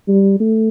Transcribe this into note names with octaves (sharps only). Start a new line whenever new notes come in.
G3
A3